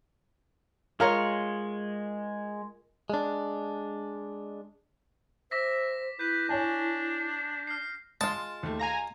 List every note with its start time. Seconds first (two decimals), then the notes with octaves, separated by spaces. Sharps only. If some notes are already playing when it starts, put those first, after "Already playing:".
1.00 G#3 F4 A#4 C#5
3.10 G#3 D4
5.51 C5 E5 D6 A#6 B6
6.19 E4 B4 G6 B6
6.49 D4 C#5 G#5 A5
7.67 F6 C7
8.21 G#3 F4 A5
8.63 D#2 A3
8.80 F5 G#5 A#5 A#6